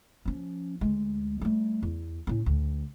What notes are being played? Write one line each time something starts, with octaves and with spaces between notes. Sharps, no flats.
F3 C#4
D2 G#3
G3 A3
E2
A2 C#4
D2